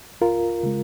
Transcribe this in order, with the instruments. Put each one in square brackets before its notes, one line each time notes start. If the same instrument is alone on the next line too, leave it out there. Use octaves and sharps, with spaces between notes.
[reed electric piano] C#2 F4 A#4
C#3 G#3